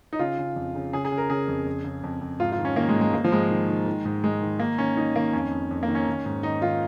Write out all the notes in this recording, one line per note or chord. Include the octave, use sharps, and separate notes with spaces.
D#4
C#3 F4
C#3
F2
C#3
C#3 G#4
G#4
C#3
A#4
C#3 G#4
F2
F2
C#3
F2
F2
G#2 F4
F4
D#3
C#4
D#3 A#3
G#3
G#2
G#3
G#2 A#3
F3
G#2 G#3
D#3
D#3
D#3
G#2
D#3 G#3
D#3
D#3 A#3
D#3 C#4
D#3 D#4
D#3 A#3
F2 C#4
F2
F2
A#3
D#3
C#4
D#3
G#2
D#3 D#4
D#3 F4